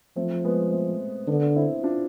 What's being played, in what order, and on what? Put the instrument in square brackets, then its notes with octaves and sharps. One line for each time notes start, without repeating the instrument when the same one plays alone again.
[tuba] F3 [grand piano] A3 C4
[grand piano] G#3 B3
A3 C4
[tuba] D3 [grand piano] B3 D4
[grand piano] C4 E4
D4 F4